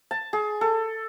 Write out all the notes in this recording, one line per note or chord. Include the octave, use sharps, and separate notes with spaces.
A5
G#4
A4